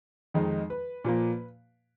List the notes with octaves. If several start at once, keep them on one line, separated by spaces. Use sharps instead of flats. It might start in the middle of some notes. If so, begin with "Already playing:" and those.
F2 D#3 G#3 D#4
B4
A#2 F3 A#3